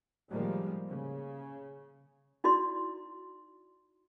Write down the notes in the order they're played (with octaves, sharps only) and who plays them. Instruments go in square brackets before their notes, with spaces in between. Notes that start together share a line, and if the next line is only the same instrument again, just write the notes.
[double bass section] A2 D#3 F3 G3 G#3 A#3
C#3
[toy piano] D#4 E4 F#4 D5 C6